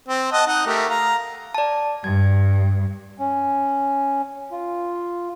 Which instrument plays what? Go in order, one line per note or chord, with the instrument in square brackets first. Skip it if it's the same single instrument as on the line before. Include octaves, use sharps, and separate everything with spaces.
[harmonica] C4
D#5 F#5 A5
D#4 D#5 F#5
A3 G4 A#4
F5 A#5
[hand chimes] D5 A5
[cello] G2 [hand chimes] G#6
[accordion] C#4
F4